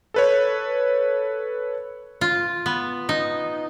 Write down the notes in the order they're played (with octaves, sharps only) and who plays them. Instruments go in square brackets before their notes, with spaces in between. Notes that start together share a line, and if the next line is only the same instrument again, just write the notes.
[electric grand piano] A4 B4 C#5
[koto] F4
B3
D#4